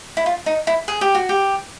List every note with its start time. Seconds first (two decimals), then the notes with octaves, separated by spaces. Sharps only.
0.17 E4
0.26 F4
0.46 D#4
0.67 E4
0.88 G#4
1.01 G4
1.15 F#4
1.29 G4